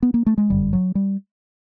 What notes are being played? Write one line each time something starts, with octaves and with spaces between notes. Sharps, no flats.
B3
A#3
A3
G#3
G1 F#2 D3 G3
F#3
G3